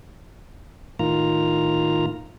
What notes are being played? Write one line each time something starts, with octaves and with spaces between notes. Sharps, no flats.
A2 D#3 F4 A#5